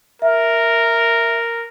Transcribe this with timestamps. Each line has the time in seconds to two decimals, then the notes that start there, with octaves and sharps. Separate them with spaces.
0.22 A#4 E5